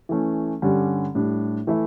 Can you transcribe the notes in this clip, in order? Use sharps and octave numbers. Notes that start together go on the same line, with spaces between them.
E3 A3 C#4
G2 D3 G3 C#4
A2 G3 D4
E3 A3 E4